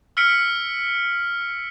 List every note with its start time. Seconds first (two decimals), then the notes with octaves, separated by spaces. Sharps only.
0.17 E6 F6 B6 C#7 D7